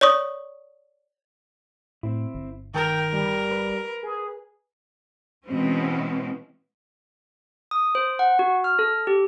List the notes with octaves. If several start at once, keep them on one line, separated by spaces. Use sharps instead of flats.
C#5 D5 C#6 D#6
A2 C4 E4
G1
D#3 A#4 G5
G3
B4
G#4
B2 E3 G#3 C4 C#4
D#6
C5
F#5
F#4
F6
A4
G4